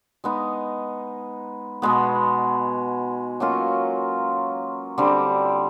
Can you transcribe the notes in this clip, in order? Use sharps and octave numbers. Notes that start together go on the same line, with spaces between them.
G#3 B3 D#4
B2 G#3 B3
F#3 A#3 C#4 F4
D3 G3 C4